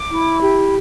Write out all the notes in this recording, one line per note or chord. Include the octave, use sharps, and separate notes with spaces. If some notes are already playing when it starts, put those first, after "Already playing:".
Already playing: D6
E4
G4